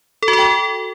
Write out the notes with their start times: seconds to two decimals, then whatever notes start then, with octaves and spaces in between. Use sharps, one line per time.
0.23 A4
0.28 F#4
0.33 A4
0.39 G5